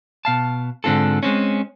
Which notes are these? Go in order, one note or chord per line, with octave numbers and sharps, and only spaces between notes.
B2 F5 A5
G#2 D3 C4 F4 A4
G#3 C4 C#4